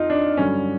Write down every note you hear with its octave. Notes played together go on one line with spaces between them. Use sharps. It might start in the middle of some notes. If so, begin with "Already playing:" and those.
Already playing: F2 D#4 F4
D4
G2 D3 F#3 C#4